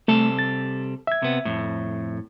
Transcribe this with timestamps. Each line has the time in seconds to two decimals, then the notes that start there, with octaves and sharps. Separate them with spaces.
0.08 C3 G3 A3 A4
0.39 A6
1.07 E5 G#6
1.22 C3 B3
1.45 F2 A2